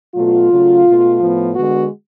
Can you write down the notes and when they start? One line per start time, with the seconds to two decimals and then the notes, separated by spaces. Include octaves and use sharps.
0.15 B2 F#3 A3 F4
0.50 C#3 F#3 A3
0.85 B2 A3
1.19 A2 F3 B3
1.54 D3 G#3 B3 F#4